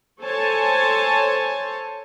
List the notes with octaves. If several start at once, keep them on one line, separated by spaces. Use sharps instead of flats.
A4 C5 C#5 G#5 A5